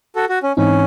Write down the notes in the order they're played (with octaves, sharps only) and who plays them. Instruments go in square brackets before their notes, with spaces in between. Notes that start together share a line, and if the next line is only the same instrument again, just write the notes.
[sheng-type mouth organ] F#4 A4
F#4
C#4
[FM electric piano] G#2 E3 C4 D#4 [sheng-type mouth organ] C#4